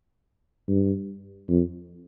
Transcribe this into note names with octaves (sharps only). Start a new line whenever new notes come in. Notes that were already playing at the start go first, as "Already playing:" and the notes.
G2
F2